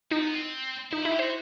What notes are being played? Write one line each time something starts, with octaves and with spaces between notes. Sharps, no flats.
C4 D#4
B3
C4
D#4 E4
F#4
E4
G4
F#4 C5